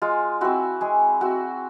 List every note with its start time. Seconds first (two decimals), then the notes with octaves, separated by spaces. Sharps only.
0.02 G#3 F4
0.41 C4 E4 F#4
0.81 G#3 G#4
1.21 C4 E4 F#4